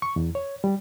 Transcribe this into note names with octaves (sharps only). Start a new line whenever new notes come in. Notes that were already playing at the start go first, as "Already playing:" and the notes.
C#6
E2
C#5
G3